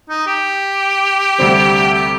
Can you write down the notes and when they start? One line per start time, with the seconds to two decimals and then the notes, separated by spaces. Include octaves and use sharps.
0.10 D#4
0.27 G4
1.39 D2 C3 G3 C4
1.94 G4